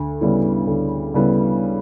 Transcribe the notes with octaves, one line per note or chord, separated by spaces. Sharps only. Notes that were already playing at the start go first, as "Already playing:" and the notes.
Already playing: D2
C#3 G3 B3 E4
D2
C#3 G3 B3 E4